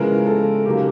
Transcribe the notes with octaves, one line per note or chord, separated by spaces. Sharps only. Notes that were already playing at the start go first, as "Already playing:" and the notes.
Already playing: C#3 F3 G#3 B3 E4 A#4
A4
C#3 F#3 A#3 D#4 G4